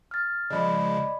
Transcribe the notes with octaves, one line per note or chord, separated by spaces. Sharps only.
F6 A6
C#3 F3 G#3 D5 D#5 B5